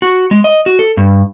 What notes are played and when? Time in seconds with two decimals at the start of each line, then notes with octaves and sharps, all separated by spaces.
0.02 F#4
0.31 G#3
0.44 D#5
0.66 F#4
0.79 A4
0.97 G2